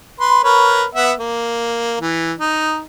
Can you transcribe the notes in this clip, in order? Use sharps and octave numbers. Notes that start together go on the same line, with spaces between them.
B4 C6
A#4 B4 C#5
B3 E5 F#5
A#3
E3
D#4